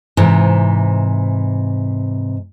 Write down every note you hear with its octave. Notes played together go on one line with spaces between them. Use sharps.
G#2 C3 E3